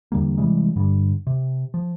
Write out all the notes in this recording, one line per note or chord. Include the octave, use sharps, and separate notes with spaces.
E2 D3 G3 A#3
C3 E3 G3 G#3
G2 D3 G3
C3
F3